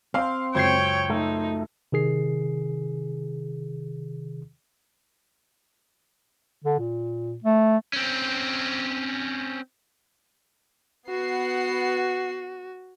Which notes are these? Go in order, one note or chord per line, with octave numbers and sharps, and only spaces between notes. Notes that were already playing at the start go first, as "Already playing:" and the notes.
C4 F5 G5 C6
C#2 F#2 C5 C#5 G5 G#6 C7
A3 D#4
C3 D#3 G#4 C7
D3
A#2
A3
C4 C#4
B3 F#4 F#5 C7